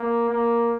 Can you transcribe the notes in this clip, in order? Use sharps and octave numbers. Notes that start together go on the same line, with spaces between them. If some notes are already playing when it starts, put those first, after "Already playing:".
Already playing: A#3
A#3